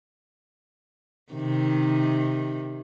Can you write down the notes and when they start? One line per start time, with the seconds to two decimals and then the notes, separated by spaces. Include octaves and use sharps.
1.33 C3 D#3